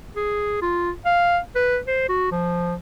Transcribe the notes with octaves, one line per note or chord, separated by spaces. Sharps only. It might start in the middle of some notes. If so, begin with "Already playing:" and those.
G#4
F4
F5
B4
C5
F#4
F3